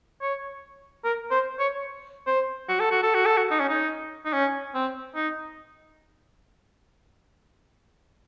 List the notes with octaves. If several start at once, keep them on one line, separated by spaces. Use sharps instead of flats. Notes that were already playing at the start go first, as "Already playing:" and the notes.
C#5
A#4
C5
C#5
C5
F#4
A4
F#4
A4
F#4
A4
F#4
D#4
C#4
D#4
D#4
C#4
C4
D#4